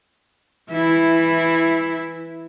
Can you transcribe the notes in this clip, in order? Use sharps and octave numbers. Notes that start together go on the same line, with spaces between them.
E3 E4